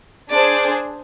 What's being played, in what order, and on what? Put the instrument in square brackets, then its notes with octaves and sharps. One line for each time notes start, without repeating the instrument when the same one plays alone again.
[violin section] D4 G#4 C5 [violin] D5